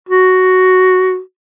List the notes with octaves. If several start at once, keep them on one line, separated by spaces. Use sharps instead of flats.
F#4